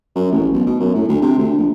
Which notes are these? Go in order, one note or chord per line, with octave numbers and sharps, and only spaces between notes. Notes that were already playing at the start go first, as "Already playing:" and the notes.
F#2
A1
B1
B2
F#2
A2
D2
C3
D2
A#1